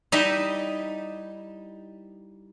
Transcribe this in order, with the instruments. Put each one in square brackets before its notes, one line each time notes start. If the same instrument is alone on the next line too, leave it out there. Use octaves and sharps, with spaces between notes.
[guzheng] G3 D#4 E4 D#5 E5